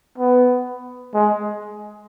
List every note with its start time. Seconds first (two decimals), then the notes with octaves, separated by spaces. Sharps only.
0.18 B3
1.14 G#3